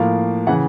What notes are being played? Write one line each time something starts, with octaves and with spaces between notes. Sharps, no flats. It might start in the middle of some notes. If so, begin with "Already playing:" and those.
Already playing: A2 F3 A#3 F5
C#3 E3 F#5